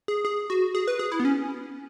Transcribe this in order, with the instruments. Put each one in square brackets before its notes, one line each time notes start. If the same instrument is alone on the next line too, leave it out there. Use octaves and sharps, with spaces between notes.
[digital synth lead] G#4
G#4
F#4
G#4
B4
G#4
E4
B3
C#4